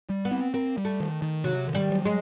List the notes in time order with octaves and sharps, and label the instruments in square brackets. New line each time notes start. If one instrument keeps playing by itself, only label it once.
[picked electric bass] G3
[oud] B3
[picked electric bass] C4
[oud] A#3 [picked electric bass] C4
[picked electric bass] G3
[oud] A3
[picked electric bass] D#3
D#3
[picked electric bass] C3 [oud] F#3
[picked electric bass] D#3
[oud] G3
[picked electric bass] F#3
[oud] G#3